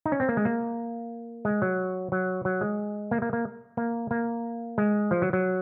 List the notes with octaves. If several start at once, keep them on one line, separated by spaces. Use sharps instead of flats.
D#4
C#4
C4
A#3
G#3
A#3
G#3
F#3
F#3
F#3
G#3
A#3
A#3
A#3
A#3
A#3
G#3
F3
F#3
F#3